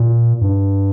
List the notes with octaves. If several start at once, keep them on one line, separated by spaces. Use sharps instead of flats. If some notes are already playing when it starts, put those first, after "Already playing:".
Already playing: A#2
G2